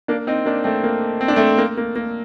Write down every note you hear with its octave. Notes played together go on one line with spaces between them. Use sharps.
A#3 D4
C4 D#4
A#3 D4
A3 C4
A#3
C4
D4
A3 C4
A#3
A#3
A#3